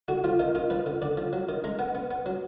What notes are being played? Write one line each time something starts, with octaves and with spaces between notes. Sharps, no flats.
D3 F#4
F3 F4
D#3 D#4
D#3 F4
F3 B4
D3
D3 D5
F3
F#3
D#3
G#3 A#5
B3 F#5
B3
B3
F#3